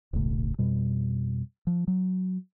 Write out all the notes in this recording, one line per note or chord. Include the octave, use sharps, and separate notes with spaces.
D#1 B1 A2 C#3
F2 B2 G3
F3
F#3